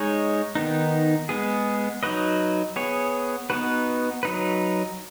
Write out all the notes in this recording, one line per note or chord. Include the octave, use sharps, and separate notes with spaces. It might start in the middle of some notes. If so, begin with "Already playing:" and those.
Already playing: G#3 D#4 G#4 C#5
D#3 B3 D#4
G#3 B3 G#4
F#3 D#4 F#4 B4 D#5
B3 G#4 C#5
B3 D#4 F#4 B4
F#3 D#4 B4